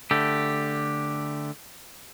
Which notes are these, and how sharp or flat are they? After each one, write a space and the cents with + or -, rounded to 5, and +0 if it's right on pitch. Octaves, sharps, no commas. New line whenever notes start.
D3 +0 A3 +0 G4 +0